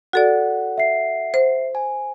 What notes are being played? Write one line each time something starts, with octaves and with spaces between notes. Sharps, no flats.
F#4 A4 D5 F#5
E5 C7
C5
G#5